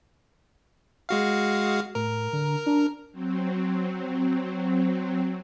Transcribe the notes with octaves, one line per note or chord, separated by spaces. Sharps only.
G#3 F#4 F5
A2 A#4
D3
D4
F#3 C4